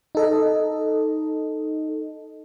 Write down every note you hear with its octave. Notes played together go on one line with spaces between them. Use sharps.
D#4 A4 D#5